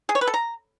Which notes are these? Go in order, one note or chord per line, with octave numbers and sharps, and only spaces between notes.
G#4
C#5
B4
A4
A#5